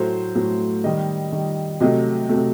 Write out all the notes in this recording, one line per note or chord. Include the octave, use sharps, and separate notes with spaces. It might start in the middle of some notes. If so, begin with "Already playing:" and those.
Already playing: A2 F#3 A3 C5
A2 F#3 A3
D#3 G3 D#5
D#3 G3
C3 F#3 A3 D#5
C3 F#3 A3